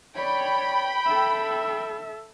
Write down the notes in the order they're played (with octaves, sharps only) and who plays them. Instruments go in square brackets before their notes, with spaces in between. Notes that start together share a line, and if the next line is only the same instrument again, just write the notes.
[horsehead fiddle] C#5 D5 [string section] G5 B5
[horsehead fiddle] A4 E5